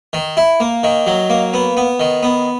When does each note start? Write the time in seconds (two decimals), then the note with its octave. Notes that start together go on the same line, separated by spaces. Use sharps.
0.13 D#3
0.37 E4
0.60 A#3
0.83 D#3
1.07 F#3
1.30 A#3
1.54 B3
1.77 B3
2.00 D#3
2.23 B3